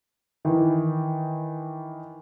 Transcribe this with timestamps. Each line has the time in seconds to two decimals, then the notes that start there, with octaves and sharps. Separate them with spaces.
0.45 D#3 E3